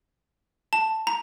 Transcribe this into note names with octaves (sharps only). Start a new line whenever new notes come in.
A5
A#5